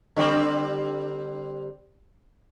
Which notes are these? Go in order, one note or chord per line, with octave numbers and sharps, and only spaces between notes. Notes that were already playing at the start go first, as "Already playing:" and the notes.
D3 G3 C4